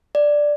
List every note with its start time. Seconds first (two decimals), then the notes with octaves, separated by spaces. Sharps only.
0.15 D5